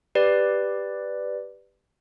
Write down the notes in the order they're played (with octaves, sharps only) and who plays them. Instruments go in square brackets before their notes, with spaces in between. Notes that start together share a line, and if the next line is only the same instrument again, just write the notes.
[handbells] G4 B4 D5